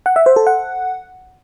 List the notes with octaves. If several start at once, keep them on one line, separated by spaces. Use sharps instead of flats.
F#5
E5
C5
A4
F#5